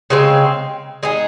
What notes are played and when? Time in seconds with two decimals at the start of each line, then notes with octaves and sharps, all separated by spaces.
0.10 C#3 G#3 C4
1.03 G#3 D#4 G#4